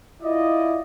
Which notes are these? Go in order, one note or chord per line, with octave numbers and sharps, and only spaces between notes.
E4 F4 D5 D#5